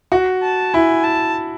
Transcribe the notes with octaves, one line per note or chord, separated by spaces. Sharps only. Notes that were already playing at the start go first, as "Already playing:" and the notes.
F#4
A5
E4 G#5
A5